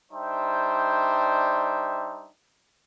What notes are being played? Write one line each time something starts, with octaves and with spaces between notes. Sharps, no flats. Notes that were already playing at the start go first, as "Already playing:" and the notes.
G3 D4 D#4 C5 E5 G5